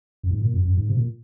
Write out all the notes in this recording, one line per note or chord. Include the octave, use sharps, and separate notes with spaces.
F#2
G#2
A#2
F#2
F#2
G#2
C3
A#2